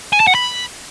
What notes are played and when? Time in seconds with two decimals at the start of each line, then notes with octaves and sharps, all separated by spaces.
0.13 G#5
0.20 A5
0.27 F#5
0.35 B5